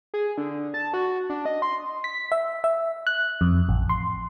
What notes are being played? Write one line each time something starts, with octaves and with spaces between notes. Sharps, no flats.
G#4
D3
A5
F#4
D4
D#5
C6
B6
E5
E5
F#6
F2
A1
C6